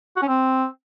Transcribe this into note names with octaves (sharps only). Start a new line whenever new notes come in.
F#4
C#4
C4